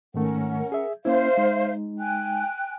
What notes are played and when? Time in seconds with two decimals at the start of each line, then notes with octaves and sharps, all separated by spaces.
0.14 G#2 D#3 A3 C#4 A#4 F#5
0.72 G#4 E5
1.05 A#3 C#4 E4 C5 E5 F5
1.37 G#3 D#4
1.99 G5 G#5 F#6